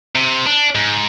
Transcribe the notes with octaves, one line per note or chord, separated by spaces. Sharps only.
C3
D4
G#2